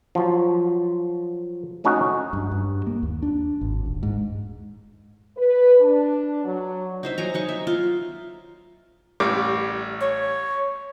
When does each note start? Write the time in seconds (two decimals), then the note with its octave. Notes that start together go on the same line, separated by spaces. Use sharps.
0.15 F3 F#3
1.84 A3 C#4 D#4 F#4
2.33 G2
2.51 G2
2.87 A#3
3.03 D#2
3.22 D4
3.61 G#1
3.86 D#1
4.03 G#2
5.37 B4
5.81 D4
6.45 F#3
7.03 D#4 C5 E5
7.18 F#3 G#5 A#5
7.34 F#3 D#4 C#6
7.49 E5
7.67 F4
9.20 A1 G3 D6
10.01 C#5